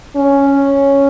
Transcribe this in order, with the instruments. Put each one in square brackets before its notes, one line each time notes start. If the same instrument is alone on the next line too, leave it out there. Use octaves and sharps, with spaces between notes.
[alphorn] C#4